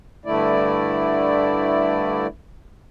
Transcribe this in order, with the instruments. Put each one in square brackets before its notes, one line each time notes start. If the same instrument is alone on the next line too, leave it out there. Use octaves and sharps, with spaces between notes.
[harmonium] G2 D3 A3 E4 D5